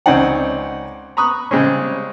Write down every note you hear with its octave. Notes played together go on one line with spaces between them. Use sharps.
C#2 C4 C#4 D#4 D5 F#5
A#5 B5 C#6 D#6 F#6
C#3 G3 G#3 C4 C#4